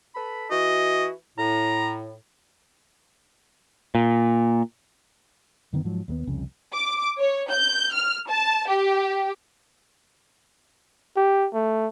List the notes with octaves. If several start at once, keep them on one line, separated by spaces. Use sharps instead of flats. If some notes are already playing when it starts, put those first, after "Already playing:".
A4 B4 B5
E3 F#4 D#5
A2 A#5
A#2
F#2 D3 D#3 B3
G#2 F3 F#3
D#2 G#3 B3
C2 F2 C#3
D6
C#5
G6
F6
A5
G4
G4
A3